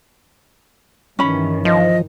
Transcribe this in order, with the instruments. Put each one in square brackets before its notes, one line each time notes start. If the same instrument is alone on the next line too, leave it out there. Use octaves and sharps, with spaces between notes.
[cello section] G2 D#3 E3 [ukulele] C#4 B5
[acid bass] F3 [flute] D#5